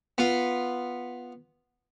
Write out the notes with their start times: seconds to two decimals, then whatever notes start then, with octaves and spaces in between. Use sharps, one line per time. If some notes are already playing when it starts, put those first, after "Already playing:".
0.18 B3 F4